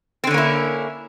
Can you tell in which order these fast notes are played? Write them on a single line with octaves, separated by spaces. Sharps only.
C4 D3 C#4 A#3 E4